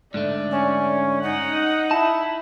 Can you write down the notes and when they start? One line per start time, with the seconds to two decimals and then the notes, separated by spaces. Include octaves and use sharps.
0.14 G#2 D3 A3 D5
0.51 C#4
1.23 D#4 F#5
1.91 E4 A5